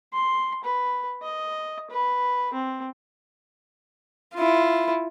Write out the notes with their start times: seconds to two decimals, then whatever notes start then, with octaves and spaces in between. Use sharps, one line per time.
0.13 C6
0.64 B4
1.22 D#5
1.90 B4
2.53 C4
4.35 E4 F4